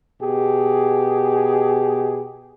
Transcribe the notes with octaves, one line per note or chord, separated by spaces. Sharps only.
B2 G4 G#4